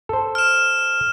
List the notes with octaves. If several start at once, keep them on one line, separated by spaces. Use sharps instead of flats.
A4 C5
F6 E7